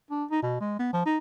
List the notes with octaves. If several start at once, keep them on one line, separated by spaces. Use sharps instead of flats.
D4
D#4
B2
G#3
B3
F3
D#4